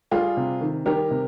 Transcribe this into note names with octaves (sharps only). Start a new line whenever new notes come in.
G3 F4 G#4
C3
D#3
G3 G4 A#4
C3